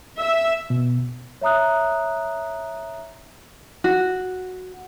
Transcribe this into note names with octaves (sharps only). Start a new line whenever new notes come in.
E5
B2
C#5 E5 A#5 D#6 F#6
F#4